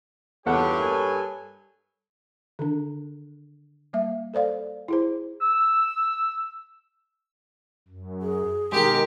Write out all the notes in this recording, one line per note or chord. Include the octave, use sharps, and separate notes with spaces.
E2 G2 F4 G4 A4 C#5 F#5
A#3 A4 G#5
D3 D#3 D4
G3 A#3 E5
A4 C5 D5 F5
E4 G#4 C5
E6
F#2
G#4
B2 D#3 G#3 G4 A#4